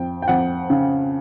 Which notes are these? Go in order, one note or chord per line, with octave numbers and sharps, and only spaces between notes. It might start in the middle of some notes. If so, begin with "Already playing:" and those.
Already playing: F2 G5
G5
F2 F#5
C#3